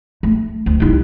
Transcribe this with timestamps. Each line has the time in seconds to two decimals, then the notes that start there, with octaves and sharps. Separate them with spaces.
0.23 A3
0.66 D2
0.80 C2 D#4